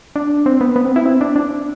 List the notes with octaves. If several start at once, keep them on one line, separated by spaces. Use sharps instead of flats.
D4
C4
B3
B3
C4
E4
C4
D4
D4